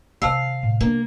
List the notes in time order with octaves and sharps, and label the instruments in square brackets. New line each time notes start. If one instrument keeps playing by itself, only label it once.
[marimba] C3 A5 E6 [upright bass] D#3 C#4 [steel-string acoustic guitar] F5
[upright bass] A2
[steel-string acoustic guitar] A#3 [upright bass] B3 D4